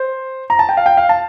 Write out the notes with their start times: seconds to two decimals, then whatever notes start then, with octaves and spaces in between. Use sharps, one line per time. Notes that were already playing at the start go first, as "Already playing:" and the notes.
Already playing: C5
0.50 A#5
0.59 A5
0.69 G5
0.77 F5
0.86 G5
0.97 F5
1.09 A5